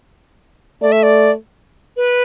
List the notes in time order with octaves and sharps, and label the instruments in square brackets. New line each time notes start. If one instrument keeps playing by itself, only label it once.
[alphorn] A3 [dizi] D5
[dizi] E5
D5
B4